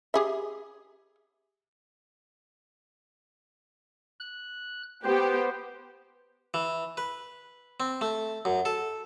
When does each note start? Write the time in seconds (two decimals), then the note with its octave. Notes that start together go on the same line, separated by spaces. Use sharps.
0.14 G4 G#4 E5
4.20 F#6
5.04 B3 G4 C5
6.54 E3
6.97 B4
7.80 C4
8.01 A3
8.45 F#2
8.65 A4